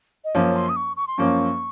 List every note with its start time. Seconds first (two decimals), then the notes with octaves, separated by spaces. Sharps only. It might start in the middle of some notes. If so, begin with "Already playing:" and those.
0.24 D#5
0.35 F#2 F3 A#3 C#4 C#5
0.55 C6
0.69 D#6
0.76 C#6
0.97 C#6
1.07 C6
1.18 F#2 F3 A#3 C#4 C#6